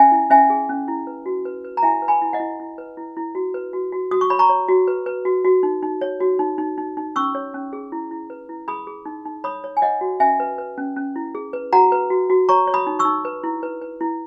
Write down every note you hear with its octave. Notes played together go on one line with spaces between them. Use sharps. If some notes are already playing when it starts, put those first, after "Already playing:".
Already playing: C#4 E5 G#5
E4
C#4 E5 G#5
G#4
C#4
E4
B4
F#4
B4
B4
A#5
E4 E5 G#5
B4
G#5 B5
E4
D#5 F#5
E4
E4
B4
E4
E4
F#4
B4
F#4
F#4
F#4 D#6
C#6
C#5 B5
A#5 C#6
C#5
F#4
B4
B4
F#4
F#4
D#4
D#4
C#5
F#4
D#4
D#4
D#4
D#4
C#4 C#6 E6
C#5
C#4
G#4
E4
E4
B4
E4
G#4 B5 D#6
G#4
D#4
D#4
C#5 B5 D#6
C#5
G#5
C#5 D#5 F#5
F#4
C#4 E5 G#5
B4
B4
C#4
C#4
E4
G#4
B4
F#4 F#5 A#5
B4
F#4
F#4
C#5 A#5 C#6
C#5
B5 D#6
D#4
C#6 E6
D#4
B4
E4
B4
B4
E4